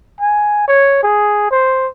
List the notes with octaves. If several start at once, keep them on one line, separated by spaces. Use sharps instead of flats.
G#5
C#5
G#4
C5